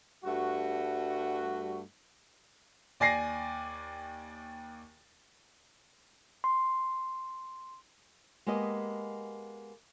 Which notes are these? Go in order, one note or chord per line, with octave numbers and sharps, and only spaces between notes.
G2 G3 A3 F#4
D#2 D5 G#5 A#6 C7
C6
G#3 A#3 B3 G4 D#5